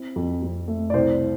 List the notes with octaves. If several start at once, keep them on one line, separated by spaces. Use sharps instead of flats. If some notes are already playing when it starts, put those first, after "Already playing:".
Already playing: C4 E4
F2
F2
A3
D5
C2 C5